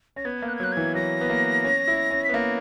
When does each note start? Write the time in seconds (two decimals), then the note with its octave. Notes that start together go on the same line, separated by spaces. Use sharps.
0.16 C#4 A#6
0.25 B3 G#6
0.42 A#3
0.48 F#6
0.56 G#6
0.60 F#3 F#6
0.72 E3 G#6
0.95 F#3 A#6
1.21 B3
1.30 A#3
1.64 C#4
1.88 E4
2.11 C#4
2.24 B3 B6
2.34 A#3 A#6